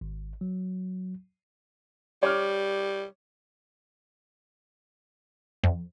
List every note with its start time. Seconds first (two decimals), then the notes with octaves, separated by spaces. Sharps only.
0.01 G#1
0.41 F#3
2.23 G3 C#5 D6 F6
5.64 F2